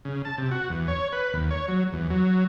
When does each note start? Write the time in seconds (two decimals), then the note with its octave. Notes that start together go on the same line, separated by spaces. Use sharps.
0.05 C#3
0.25 A5
0.38 C3
0.51 F#4
0.70 E2
0.88 C#5
1.13 B4
1.33 D#2
1.51 C#5
1.68 F#3
1.92 E2
2.10 F#3